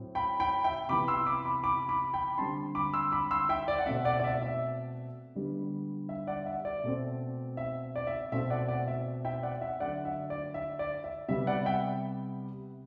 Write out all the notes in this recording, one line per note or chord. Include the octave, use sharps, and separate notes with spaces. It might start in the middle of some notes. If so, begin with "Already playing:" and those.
Already playing: A2 F#3 C4
G5 B5
G5 B5
E5 G5
C3 E3 B3 B5 D6
C6 E6
B5 D6
B5 D6
B5 D6
B5 D6
G5 B5
D3 G3 C4 A5 C6
B5 D6
C6 E6
B5 D6
C6 E6
E5 G5
D5
F#5
B2 A3 C4 E5
D5 F#5
D5
E5
E5
D3 G3 B3
E5
D5 F#5
E5
D5
B2 A3 C4
E5
D5
E5
B2 A3 C4 E5
D5 F#5
D5
E5
E5 G5
D5 F#5
E5
D3 F#3 A3 D5 F#5
E5
D5
E5
D5
E5
C3 G3 B3 E5
D5 F#5
E5 G5